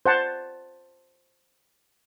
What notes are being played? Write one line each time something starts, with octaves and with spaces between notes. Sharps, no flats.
C5 F#5 A5